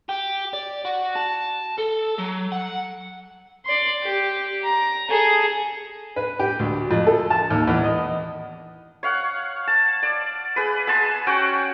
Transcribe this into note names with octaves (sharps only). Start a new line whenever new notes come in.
G4
D5
F#4
A5
A4
F#3
F#5
D5 C6
G4
A#5
G#4 A4
B4
G4
D2
F2
A4
A5
D#2
E2
D#5
C#5 F5 F#5
A5
D5
G#4 B4
G#4 F#5 A5 C6
C#4 F#4 F#5 G5